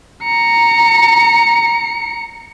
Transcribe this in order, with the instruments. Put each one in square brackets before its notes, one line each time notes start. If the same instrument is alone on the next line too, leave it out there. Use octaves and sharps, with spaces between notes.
[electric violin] A#5 C#7